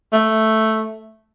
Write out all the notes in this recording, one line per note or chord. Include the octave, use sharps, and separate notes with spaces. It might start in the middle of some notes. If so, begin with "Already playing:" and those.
A3